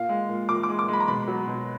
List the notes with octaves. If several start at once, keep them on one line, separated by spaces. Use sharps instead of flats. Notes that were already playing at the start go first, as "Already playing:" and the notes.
Already playing: A#2 F5
G#3
A#2
A#2 D6
D6
G#3
D6
G#3 B5
A#5
B2 B5
F#3
B2